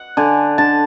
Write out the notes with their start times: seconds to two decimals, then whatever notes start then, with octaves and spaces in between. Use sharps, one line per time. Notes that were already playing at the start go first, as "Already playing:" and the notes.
Already playing: F#5
0.17 D3 G#5
0.58 D3 A5